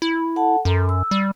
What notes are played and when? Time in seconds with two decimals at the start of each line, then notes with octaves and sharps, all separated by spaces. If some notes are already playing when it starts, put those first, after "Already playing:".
0.02 E4
0.36 A4 F#5 A5
0.65 F#2 A4 A#5 C6
0.89 E6
1.11 G3